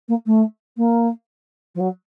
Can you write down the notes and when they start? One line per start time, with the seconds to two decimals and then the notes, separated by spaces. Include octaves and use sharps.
0.08 A#3
0.26 A3
0.77 A#3
1.75 F3
1.80 F#3